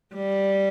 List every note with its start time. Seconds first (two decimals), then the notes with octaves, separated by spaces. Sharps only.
0.15 G3